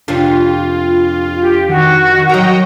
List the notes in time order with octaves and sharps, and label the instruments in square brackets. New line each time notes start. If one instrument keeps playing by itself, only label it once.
[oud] F2 C3 D4 [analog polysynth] F4
[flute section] G4
[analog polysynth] D#3 [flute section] F#4
[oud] D#3 F#3 [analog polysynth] D#5 G5 A#5